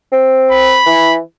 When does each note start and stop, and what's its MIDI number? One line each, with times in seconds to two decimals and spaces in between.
0.12 0.79 60
0.52 1.15 83
0.86 1.17 52